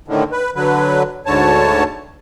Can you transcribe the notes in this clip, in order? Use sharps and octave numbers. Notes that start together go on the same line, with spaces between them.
A2 D3 D#3
B4
D3 F#3 B4
D2 G#2 D3 C#5 A5